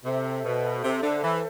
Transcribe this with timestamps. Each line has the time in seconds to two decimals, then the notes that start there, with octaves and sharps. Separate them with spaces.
0.04 C3 A4 C5 E5
0.44 B2
0.84 C3
1.03 D3
1.23 E3